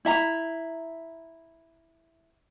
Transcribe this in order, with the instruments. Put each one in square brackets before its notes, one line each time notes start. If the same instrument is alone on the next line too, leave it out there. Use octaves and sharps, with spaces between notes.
[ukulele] E4 E5 A#5